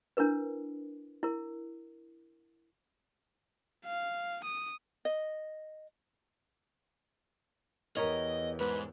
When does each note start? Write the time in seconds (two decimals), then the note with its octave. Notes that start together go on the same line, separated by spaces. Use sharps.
0.17 D4 E4 A#4 B4
1.23 E4 A#4
3.85 F5
4.45 D#6
5.05 D#5
7.97 E2 G4 A#4 C#5 D#5
8.60 G#2 B4